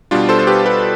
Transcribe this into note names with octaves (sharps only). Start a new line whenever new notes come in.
B2 G3 D4 F4
A4 C5
C5
G4 B4
G4 B4